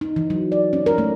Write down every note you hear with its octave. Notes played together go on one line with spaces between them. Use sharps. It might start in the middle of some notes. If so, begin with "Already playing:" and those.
D#4
E3
F#3
D5
C#4
A#4
A3